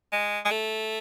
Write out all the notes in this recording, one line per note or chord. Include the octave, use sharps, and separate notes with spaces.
G#3
G#3
A3